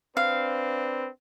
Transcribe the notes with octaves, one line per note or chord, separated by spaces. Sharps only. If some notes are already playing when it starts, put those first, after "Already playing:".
C4 D4 B4 F5